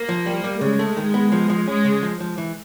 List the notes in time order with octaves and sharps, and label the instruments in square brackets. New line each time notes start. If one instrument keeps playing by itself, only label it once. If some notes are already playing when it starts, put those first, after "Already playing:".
Already playing: [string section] A#3
[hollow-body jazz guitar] F3
G3
G3
[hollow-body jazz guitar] C#3 [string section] G#3
[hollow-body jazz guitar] A3
D#3
B3
F3
F3
[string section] G#3 [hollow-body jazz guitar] C#4
[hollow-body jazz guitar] C#3
F3
F3
E3